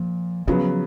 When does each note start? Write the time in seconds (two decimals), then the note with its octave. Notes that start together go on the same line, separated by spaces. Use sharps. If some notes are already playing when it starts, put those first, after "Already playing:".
Already playing: A#2 F3
0.47 C#3 F3 F#3 B3